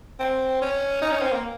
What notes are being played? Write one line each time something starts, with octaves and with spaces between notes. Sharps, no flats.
C4
C#4
D#4
C#4
C4
A#3